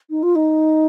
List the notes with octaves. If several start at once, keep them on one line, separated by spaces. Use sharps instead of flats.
D#4
F4
D#4